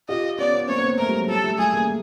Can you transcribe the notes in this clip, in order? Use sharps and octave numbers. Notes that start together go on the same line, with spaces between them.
F4 G4 D#5
B3 C#4 D5
B3 C#4
A#3 C4 C#5
B3
A#3 C4
A3 B3 A#4
G3
F#3
G3 A4
G3 A3
G3 A3 G#4
G#3 A#3